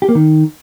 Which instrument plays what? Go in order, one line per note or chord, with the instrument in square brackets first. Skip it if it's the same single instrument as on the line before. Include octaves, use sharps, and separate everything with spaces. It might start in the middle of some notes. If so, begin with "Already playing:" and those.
[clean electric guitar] G4
A#3
D#3